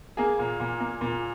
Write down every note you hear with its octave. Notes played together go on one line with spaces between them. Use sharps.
A#3 G#4
A#2
A#2
A#3
A#2